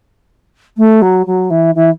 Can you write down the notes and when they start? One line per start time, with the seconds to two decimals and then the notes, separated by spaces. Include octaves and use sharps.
0.77 A3
1.01 F#3
1.26 F#3
1.50 E3
1.75 E3